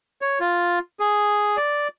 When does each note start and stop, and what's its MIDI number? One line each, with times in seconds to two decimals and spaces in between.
0.21 0.39 73
0.40 0.79 65
1.00 1.57 68
1.57 1.88 74